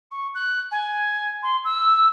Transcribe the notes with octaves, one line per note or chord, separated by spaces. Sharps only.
C#6
F#6
G#5
C6
E6